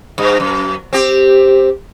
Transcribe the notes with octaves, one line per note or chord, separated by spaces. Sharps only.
G2
F#2
C4 G4